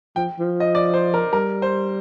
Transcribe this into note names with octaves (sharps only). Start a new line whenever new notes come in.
F3 G5
F3
D#5
D5
C5
A#4
G3 A#4
C5